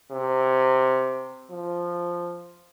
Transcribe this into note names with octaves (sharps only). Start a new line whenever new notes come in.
C3
F3